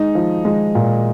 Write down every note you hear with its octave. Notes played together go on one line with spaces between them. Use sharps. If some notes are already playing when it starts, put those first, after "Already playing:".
Already playing: G#3 D#4
F3
G#3
A#2